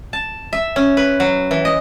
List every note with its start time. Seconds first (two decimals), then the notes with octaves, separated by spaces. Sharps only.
0.13 A5
0.53 E5
0.76 C#4
0.97 B4
1.20 F#3
1.51 E3
1.65 D#5